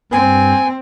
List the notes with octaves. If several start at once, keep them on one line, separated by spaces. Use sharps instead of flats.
G2 C4 G#5